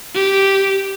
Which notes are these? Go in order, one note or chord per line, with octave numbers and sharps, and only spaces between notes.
G4